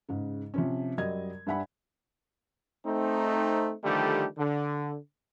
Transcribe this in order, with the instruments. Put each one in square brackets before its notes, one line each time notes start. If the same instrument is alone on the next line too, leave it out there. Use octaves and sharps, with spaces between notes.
[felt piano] G#2 C#3
C3 F3 C#4
F#2 F#3 G3 D#5 G#6
G2 G3 E5 F#5 G#5 B5
[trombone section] A3 C4 D#4
D3 D#3 F3 G3 A3 G4
D3